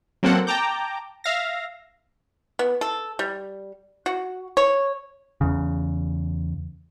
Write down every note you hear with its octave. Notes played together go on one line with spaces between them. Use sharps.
F#3 A#3 C4 A4 F#5
G5 A5 A#5 D6 G6
E5 F5 A#6
B3
A4
G3
F#4
C#5
E2 C#3